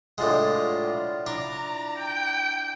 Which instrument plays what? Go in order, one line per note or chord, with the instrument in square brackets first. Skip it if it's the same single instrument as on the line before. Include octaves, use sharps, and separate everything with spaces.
[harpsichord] A2 G#3 [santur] D4 F4 F#5
[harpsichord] D4 [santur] E4 [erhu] A#5
[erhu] G5